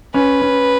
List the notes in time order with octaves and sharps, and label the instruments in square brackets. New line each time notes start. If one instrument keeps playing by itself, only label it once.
[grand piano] C#4 [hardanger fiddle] B4
[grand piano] C#4